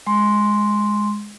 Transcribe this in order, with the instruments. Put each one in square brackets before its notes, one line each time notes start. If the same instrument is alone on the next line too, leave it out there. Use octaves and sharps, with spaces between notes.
[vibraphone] G#3 C6